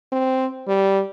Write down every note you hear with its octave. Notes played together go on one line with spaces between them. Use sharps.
C4
G3